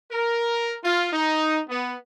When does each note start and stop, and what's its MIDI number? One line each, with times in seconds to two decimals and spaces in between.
0.11 0.75 70
0.84 1.12 65
1.13 1.61 63
1.69 1.95 59